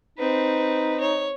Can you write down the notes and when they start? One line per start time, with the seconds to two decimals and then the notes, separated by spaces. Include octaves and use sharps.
0.18 C4 D#4 B4
1.00 C#5